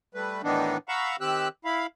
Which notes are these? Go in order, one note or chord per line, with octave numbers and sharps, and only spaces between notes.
G3 A3 B4
A2 D#3 E3 B3 D4 D#4
F5 F#5 A#5 B5 C#6 E6
D#3 C4 G4 E6 F#6
E4 F5 B5